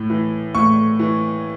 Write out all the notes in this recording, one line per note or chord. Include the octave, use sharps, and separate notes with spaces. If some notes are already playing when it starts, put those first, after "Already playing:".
Already playing: A2
E3
A2 C#6
E3